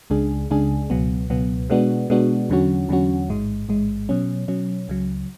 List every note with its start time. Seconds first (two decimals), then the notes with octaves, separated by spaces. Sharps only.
0.10 C#2 C#3 G#3 D4 G#4
0.50 C#2 C#3 G#3 D4 G#4
0.90 C#2 B2 F#3 B3
1.30 C#2 B2 F#3 B3
1.70 B2 G#3 B3 D4 F#4
2.10 B2 G#3 B3 D4 F#4
2.50 E2 D3 F#3 C#4 F#4
2.89 E2 D3 F#3 C#4 F#4
3.28 A1 G#2 G#3
3.69 A1 G#2 G#3
4.09 B2 F#3 C#4
4.48 B2 F#3 C#4
4.88 C#2 C#3 F#3